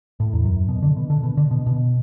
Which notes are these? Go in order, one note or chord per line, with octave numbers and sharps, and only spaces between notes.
A2
E2
F#2
B2
D3
B2
D3
B2
D3
B2
B2